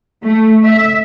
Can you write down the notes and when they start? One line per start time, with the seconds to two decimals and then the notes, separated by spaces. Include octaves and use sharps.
0.24 A3
0.65 E5